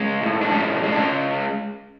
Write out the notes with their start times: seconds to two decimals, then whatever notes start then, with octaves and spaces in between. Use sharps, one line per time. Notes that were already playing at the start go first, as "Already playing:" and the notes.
Already playing: G#3 C#4
0.21 A2
0.41 D4
0.52 G#3 C#4
0.84 G#3
0.93 D4
0.99 C#4